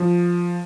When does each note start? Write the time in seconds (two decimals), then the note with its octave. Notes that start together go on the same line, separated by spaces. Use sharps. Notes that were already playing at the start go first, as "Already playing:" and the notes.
Already playing: F3